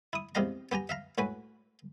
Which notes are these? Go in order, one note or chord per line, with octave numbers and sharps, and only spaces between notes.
E4 D#6
E2 C3 G4 D#5 F5 A#5
B3 G4 G#5 A#5
E5 F5 A#5
A2 F#4 B4 G#5